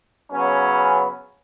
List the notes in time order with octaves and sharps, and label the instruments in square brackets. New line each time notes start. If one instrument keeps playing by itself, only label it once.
[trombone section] C#3 F#3 B3 C#4